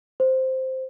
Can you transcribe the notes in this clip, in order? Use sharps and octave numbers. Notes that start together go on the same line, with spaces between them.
C5